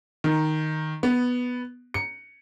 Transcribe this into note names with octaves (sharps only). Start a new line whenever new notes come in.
D#3
B3
C#7